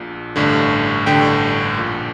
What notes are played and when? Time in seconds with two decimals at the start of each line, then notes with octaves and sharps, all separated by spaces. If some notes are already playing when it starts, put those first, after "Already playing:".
Already playing: A#1 A#2
0.36 A1 G2 D3
1.06 A1 G2 D3 G5
1.77 A#1 A#2